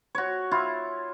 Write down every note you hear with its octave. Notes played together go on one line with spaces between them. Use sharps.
F#4 C#5
E4 F4